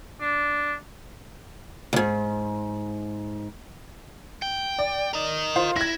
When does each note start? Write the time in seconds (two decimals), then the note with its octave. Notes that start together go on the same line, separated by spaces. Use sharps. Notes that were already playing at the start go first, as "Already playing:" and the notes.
0.21 D4
1.93 D2 G#2
4.42 G5
4.79 D5
5.13 A#4 D#5
5.56 F4 C5
5.76 E4 G#6 A#6